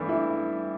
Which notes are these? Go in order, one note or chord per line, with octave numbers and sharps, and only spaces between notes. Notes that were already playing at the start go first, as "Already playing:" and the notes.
Already playing: G2 E3 A3 B3 D4
E4